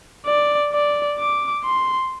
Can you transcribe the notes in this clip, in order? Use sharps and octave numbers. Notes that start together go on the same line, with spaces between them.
D5
D5
D6
C6